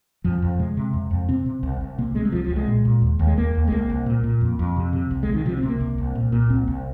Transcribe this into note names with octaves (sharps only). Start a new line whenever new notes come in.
F2 F3
F2
C3 G#3
C3
F2
F2
C3 C4
C3
C2
C2
C3 A#3
C3 G#3
G#3
C2 F3
F3
C2
G#3
A#2
A#2
D#2
D#2
G#3
D#2 A#3
D#2
G#3
C2 A#3
C2
A#2
A#2
F2
F2
C3
C3
C2
G#3
C2
D#3
C3 F3
C4
C3
A#3
C2
C2
A#2
A#2
C2 C4
C2